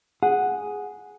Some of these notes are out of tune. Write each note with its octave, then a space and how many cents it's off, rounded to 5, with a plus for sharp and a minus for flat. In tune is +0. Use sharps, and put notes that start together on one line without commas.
G#4 +0 F#5 +0